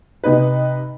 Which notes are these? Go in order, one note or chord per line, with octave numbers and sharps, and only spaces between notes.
C3 D#4 B4